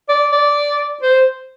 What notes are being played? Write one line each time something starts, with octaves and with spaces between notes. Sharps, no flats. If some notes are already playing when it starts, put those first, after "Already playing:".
D5
D5
C5